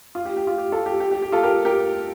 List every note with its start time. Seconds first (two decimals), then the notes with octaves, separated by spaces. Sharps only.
0.15 F4
0.25 G4
0.37 G4
0.47 F4
0.58 G4
0.72 F4 A4
0.86 G4
1.00 G4
1.11 G4
1.23 G4
1.32 F4 A4
1.43 G4 A#4
1.65 G4 A#4